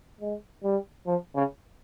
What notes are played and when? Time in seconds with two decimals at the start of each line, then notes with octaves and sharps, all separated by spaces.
0.21 G#3
0.64 G3
1.07 F3
1.35 C#3